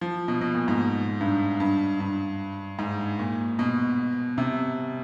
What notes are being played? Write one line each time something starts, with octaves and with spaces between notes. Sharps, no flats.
F3
B2
B2
A#2
G#2
G2
G2
G2
G#2
A#2
B2
C3